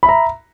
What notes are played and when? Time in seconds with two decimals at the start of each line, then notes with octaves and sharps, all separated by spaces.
0.03 B5
0.06 E5
0.09 A#5